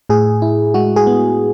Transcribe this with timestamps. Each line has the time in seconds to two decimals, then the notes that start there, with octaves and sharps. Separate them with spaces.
0.09 A2 G#4
0.42 E4
0.74 G#3 F#4
0.96 G#4
1.07 B3